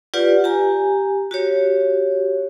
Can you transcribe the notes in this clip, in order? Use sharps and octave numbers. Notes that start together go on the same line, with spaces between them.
F4 G4 B4 D5 F#5
G4 G#5 A#5
F#4 G4 C#5